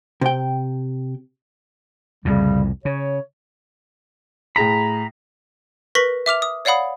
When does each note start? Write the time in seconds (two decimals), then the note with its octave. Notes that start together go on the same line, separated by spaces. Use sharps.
0.21 C3 G5
2.25 C2 F2 A2 C#3 G3
2.85 C#3 C#5
4.56 A2 G#4 A#5 B5 A#6
5.95 A#4 B4 C#6 A#6 B6 F#7
6.26 E5 D6 F6 F7
6.42 D#6
6.65 C#5 D5 F5 F#5 B5 D#6